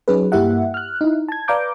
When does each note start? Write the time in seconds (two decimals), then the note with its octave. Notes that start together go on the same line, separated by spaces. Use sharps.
0.08 F#3 C#4 D#4 G#4 B4
0.32 G2 A#3 E4 G4 E5 F#5
0.74 F6 F#6
1.01 D#4 E4
1.28 A5 G#6
1.48 B4 D5 F5 A#5 D6 G6